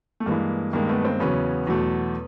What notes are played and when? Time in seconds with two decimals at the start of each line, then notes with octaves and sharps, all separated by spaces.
0.20 A3
0.26 G2 E3 G#3 A#3
0.73 G2 D#3 G#3 A#3
0.89 A3 B3
1.05 A#3 C4
1.20 E2 C#3 F#3 B3 C#4
1.67 E2 B2 F#3 A3